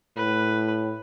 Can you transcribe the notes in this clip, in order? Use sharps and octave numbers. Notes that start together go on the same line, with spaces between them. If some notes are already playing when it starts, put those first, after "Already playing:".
A2 B4